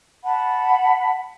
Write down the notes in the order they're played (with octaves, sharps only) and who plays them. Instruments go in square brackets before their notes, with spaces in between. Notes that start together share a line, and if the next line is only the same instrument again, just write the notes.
[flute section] F#5 A5 B5